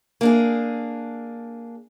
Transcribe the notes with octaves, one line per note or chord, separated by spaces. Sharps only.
A#3 D4 G#4